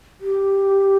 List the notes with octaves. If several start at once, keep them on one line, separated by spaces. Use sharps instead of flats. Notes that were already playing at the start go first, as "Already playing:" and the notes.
G4